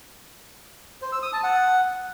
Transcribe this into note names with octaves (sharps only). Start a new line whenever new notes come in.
C5
E6
D#6
A5
F#5